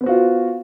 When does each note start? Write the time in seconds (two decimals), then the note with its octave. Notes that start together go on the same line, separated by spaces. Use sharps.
0.01 B3
0.04 C5
0.06 F#4
0.09 F4